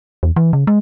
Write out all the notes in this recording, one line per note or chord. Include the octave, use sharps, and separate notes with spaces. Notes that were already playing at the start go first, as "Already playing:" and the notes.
E2
E3
C#3
G#3